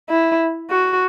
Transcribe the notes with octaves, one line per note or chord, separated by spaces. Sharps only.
E4
F#4